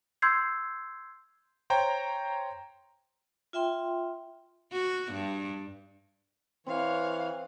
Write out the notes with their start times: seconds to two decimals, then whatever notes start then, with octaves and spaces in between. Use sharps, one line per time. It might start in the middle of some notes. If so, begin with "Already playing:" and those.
0.22 C6 E6 G6 G#6 C7
1.70 C5 C#5 G5 A#5
3.53 F4 E5 G5 C6
4.72 F#4
5.13 G2
6.66 E3 C4 C#5 F5